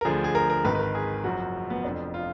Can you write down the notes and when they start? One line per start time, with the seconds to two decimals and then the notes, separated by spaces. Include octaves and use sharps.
0.01 A#4
0.05 D2 D3 F3 G#4
0.24 G#4
0.35 A#4
0.50 A#4
0.65 G#1 G#2 D#3 B4
0.75 B4
0.80 A#4
0.95 G#4
1.24 F#1 F#2 F3 F#4
1.70 B3
1.84 F1 F2 F3 D4
2.14 F4